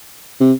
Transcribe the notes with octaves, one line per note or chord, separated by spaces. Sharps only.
C3